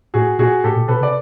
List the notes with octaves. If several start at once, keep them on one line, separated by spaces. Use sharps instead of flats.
A2 F#4 G#4
A#2 F#4 G#4
A2 G4 A4
A#2
B2 A4 B4
C3 D5